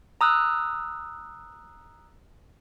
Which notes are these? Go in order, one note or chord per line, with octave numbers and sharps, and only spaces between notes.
A#5 D#6 E6 F#6